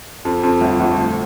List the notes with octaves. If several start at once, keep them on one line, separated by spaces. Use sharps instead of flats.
F2
F2
G1
G1
D2